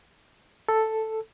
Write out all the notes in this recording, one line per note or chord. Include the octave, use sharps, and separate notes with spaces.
A4